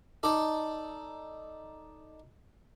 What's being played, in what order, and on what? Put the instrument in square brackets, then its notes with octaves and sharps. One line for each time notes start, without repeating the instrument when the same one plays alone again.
[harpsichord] D#4 A4 D5